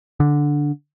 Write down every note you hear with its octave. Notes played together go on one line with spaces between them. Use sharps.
D3